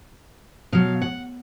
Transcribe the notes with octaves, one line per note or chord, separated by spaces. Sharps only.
B2 F#3 F5
F#5